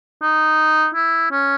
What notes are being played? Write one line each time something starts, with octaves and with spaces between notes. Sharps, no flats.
D#4
E4
C#4